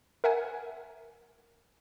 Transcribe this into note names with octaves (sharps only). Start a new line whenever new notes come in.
A#4 E5 F#5 G#5